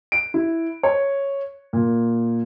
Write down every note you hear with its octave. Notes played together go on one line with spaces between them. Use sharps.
D7
E4
C#5
A#2